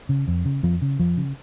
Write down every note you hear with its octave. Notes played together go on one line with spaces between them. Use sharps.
C#3
F2
C#3
F2 F3
C#3
F2 F3
C#3